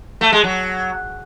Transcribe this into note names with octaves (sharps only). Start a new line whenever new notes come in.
A3
G#3
F#3